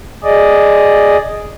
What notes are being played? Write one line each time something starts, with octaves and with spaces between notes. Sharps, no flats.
G#4 D5 D#5